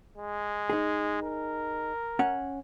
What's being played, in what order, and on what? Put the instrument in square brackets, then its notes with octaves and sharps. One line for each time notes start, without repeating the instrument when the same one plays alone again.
[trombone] G#3
[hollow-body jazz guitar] D#4 G#4
[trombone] A#4
[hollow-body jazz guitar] C#4 F#5